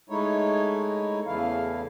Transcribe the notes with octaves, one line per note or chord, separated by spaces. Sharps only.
G#3 A3 D#4 E4 C#5
E2 C#3 E3 A3 E4 F5